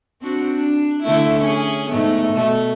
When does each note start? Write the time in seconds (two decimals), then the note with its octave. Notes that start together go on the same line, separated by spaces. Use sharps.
0.21 C4 D4 F#4
0.58 D4
1.03 D3 A3 E4
1.39 C#4 G#4
1.90 G#2 A3 B3
2.34 B2 A3